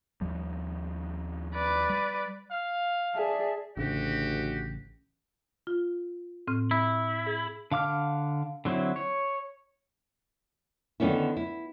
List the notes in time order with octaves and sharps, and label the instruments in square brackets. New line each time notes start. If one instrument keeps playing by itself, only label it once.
[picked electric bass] D#2 F3 G3
[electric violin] B4 D5
[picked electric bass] G3
[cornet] F5
[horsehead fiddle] G#4 [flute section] D5 E5 A5
[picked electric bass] A1 C#3 [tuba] D2 [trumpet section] F#4 G4
[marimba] F4
A2 C4 F6
[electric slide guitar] E4
[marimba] G#4
[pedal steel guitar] D3 F5 D6 F6
D3 F#3 C4 E4
C#5
[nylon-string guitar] D3 D#3 A3 B3 C#4 E4
E4